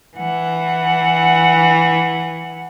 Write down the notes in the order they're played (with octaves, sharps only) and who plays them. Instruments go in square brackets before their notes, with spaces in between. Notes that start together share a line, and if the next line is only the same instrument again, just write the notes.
[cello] E3 F#5